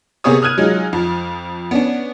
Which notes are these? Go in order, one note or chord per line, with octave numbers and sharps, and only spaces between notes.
C3 A#3 B3 G#4 C#5 D#6
D#6 F6 F#6 G#6 D#7
F#3 G#3 D#4 F4
F2 F3
B3 C#4 D4